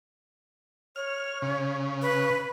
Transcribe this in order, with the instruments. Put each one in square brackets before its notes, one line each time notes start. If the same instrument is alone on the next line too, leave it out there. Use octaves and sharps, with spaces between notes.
[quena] C#5 [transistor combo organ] F6
[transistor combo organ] C#3
[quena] B4